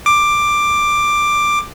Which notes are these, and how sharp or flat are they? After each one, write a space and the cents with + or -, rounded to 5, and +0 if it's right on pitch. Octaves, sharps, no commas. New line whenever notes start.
D6 +10